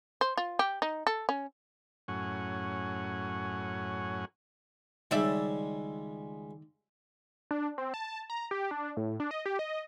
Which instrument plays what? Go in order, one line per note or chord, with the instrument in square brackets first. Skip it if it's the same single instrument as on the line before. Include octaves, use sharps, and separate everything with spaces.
[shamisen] C5
F4
G4
D#4
A4
C#4
[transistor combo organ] F#2 A2 C#4 F#5 G#5
[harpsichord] C#2 G3 G#3 [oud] D#3 D5 E5
[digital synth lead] D4
C4
A5
A#5
G4
D4
A2
D4
D#5
G4
D#5